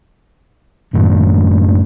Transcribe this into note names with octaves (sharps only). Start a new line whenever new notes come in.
F#1 F#2 A2 D#3